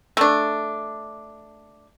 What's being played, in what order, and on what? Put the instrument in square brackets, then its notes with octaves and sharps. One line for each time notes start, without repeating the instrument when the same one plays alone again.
[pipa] A3 D4